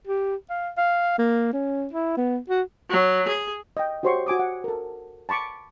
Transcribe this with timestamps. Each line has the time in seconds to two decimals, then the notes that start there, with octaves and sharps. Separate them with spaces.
0.07 G4
0.50 F5
0.77 F5
1.18 A#3
1.53 C#4
1.93 E4
2.17 B3
2.49 F#4
2.90 F#3
3.27 G#4
3.77 D#5 G5
4.03 F#4 G4 C5 C#5 C6 C#6
4.26 F#4 G#5 D6 D#6
4.39 F#5
4.64 A4 A#4
5.29 A5 B5 C#6 D6